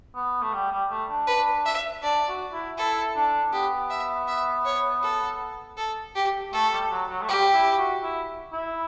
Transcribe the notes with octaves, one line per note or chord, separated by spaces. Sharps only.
B3
A3
G3
G3
A3
D4
B4
E5
D4 D5
F#4
E4
E4 A4
D4
B3 G4
E5
E5
C#5
A4
A4
G4
A3 A4
G3
F#3
F#3
A3
G3 G4
E4
F#4
E4
E4